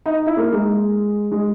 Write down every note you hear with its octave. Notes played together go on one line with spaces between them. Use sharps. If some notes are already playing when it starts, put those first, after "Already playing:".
D#4
E4
A#3
G#3
G#3